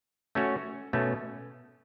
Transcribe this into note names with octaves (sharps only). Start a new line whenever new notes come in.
A3 C#4 F#4 C#5
B2 A3 C#4